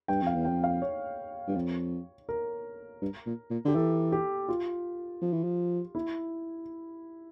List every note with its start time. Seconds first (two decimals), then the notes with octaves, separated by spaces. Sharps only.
0.08 G2 G5
0.22 F2 F5
0.35 E2
0.45 F2 G5
0.64 F5
0.82 C#5
1.48 G2
1.56 F2
2.29 A#4
3.02 G2
3.26 A#2
3.50 A#2
3.65 D3 G4
3.75 E3 A4
4.12 G4
4.49 F4
5.21 F3
5.33 E3
5.44 F3
5.95 E4